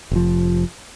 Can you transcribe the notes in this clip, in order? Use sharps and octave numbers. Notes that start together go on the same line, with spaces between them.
F1 F3